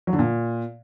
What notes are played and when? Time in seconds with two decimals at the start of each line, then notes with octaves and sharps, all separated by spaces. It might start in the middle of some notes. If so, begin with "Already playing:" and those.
0.07 F#3
0.13 D3
0.19 A#2